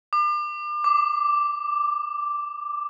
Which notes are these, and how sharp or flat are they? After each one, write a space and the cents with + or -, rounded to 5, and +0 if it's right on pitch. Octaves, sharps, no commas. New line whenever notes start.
D6 +35
D6 +0